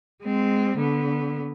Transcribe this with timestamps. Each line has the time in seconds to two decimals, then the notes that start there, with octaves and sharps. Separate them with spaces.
0.23 G#3 C4
0.78 D3 B3